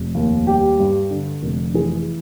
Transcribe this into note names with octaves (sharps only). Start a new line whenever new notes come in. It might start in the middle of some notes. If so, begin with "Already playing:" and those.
Already playing: F1
D#2
G3 G4
G2
D3
F1
E3 G#4